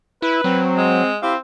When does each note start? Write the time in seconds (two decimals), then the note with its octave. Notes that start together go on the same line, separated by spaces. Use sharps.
0.22 E4 B4
0.44 F#3 C4
0.77 G#3
1.23 C4 E4 G4 F5